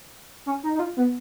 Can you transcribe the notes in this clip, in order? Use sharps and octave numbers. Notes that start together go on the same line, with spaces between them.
C#4
D#4
D#4
F4
B3